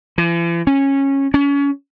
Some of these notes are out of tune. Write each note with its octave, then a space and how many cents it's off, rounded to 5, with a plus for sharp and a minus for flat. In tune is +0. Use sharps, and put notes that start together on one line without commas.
E3 +45
C#4 -15
C#4 +30